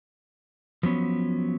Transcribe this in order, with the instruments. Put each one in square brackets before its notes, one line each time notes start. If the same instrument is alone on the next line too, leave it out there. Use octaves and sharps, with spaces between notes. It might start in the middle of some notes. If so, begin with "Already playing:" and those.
[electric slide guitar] F3 F#3 B3 C#4